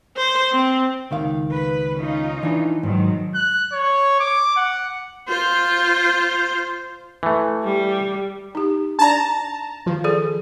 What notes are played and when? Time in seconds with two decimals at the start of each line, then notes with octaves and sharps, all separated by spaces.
0.17 C5
0.52 C4
1.11 C#2 D#3 F5
1.51 B4
1.96 C#4 D#4 F4
2.43 E3 D4
2.83 G#2 B2 D#3 F#3
3.35 F#6
3.73 C#5
4.20 D6
4.56 F#5
5.29 F4 C5
7.23 E3 A3
7.63 G3
8.55 D#4 G4
8.99 D4 D5 A5 A#5
9.86 D#3 F3
10.04 G#4 A4 D5